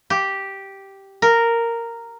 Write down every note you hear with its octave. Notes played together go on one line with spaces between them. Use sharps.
G4
A#4